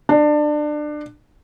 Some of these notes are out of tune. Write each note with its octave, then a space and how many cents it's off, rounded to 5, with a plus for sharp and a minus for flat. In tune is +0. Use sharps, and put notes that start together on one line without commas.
D4 +25